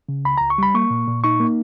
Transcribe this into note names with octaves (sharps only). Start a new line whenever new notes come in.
C#3
C#2 B5
C#2 A#5
C#6
G3 B5
A#3 C#6
A#2
A#2
D#4 C#6
A#3